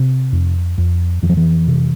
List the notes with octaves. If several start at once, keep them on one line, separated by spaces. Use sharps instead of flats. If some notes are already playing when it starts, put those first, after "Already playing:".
Already playing: C3
F2
F2
F2 E3
F3
E3
C3